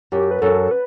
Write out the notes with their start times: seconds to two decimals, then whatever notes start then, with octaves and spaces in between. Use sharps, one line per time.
0.12 F#2 G4
0.31 B4
0.42 F#2 A4
0.71 B4